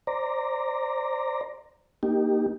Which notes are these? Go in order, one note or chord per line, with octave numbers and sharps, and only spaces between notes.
C5 D5 A#5
A#3 D#4 G4